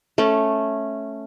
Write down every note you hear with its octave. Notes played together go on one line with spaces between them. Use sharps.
A3 C#4